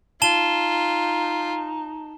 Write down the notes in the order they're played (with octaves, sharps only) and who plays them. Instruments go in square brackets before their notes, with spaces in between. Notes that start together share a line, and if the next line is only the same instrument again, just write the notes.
[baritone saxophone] D#4 [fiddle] F4 [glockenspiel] A5 E7 G7